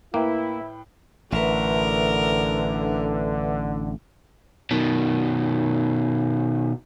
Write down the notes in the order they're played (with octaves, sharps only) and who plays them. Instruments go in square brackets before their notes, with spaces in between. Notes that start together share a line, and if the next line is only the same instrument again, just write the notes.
[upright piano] A2 B4 G5 [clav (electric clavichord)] A#3 [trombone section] E4
[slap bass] A1 [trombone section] D3 [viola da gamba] A#4 [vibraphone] B4 E5
[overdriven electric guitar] B2 D#3